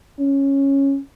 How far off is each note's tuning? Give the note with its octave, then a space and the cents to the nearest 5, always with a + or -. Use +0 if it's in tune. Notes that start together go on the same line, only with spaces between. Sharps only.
C#4 -10